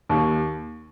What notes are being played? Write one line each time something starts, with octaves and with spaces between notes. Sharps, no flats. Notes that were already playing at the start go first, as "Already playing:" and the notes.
D#2